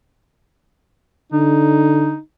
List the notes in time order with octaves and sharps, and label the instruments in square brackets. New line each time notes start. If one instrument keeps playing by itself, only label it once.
[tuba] D3 [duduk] D#4